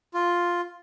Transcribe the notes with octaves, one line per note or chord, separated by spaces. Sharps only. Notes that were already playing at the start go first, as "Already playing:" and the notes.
F4